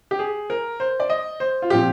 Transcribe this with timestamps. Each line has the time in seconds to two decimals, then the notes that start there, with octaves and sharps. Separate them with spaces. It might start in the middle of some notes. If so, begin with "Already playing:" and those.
0.11 G4
0.19 G#4
0.50 A#4
0.80 C5
1.00 D5
1.10 D#5
1.40 C5
1.62 F4
1.70 A#2 F3 C4 G4